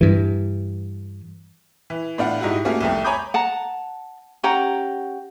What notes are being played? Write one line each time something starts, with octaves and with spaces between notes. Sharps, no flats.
G2 E3
E3
A2 D4 F4 F#5
G#2 D#4 E4 F#4 G4
A3 A#3 C#4 F4 F#4 G#4
C2 F2 A3
C#5 G#5 A#5 B5 D6 G6
F#5 A5 A#5
C#4 G4 F#5 A#5